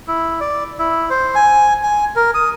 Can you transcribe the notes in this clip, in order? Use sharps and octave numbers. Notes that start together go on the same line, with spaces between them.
E4
D5
E4
C5
G#5
G#5
A#4
D#6